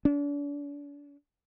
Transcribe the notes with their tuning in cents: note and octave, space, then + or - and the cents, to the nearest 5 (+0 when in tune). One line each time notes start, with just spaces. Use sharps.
D4 -40